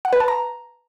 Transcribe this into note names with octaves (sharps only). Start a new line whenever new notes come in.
F#5
B4
A5
A#5